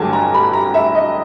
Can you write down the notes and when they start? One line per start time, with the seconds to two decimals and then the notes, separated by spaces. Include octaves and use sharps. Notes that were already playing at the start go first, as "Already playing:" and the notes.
Already playing: A1 G2 D3 F#3 G#5 A5
0.13 A#5
0.34 B5
0.53 A#5
0.74 E5
0.95 D#5